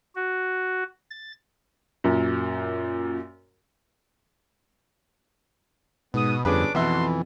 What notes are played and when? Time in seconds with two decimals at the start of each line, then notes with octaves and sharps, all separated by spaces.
0.15 F#4
1.10 A6
2.04 F#2 A#2
6.14 G#2 B2 B3 D#6
6.45 G1 F2 C#4 D4 G#4 B4 D6
6.75 F2 B2 E3 F#4 E5 A5 C6